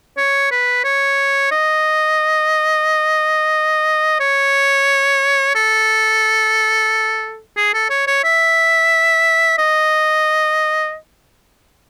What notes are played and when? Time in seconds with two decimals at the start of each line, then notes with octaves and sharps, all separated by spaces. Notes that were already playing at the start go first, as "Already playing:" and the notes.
0.17 C#5
0.51 B4
0.84 C#5
1.52 D#5
4.20 C#5
5.55 A4
7.57 G#4
7.74 A4
7.90 C#5
8.07 C#5
8.24 E5
9.58 D#5